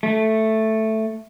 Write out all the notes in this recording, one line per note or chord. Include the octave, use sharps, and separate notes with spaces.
A3